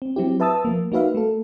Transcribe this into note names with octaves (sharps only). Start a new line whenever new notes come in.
C4
F#3 C4 E4 G4
B4 E5 A5 D#6 E6 A6
F3 A#3
A#3 D#4 F#4 B4 E5 F5
A3 A#3 A4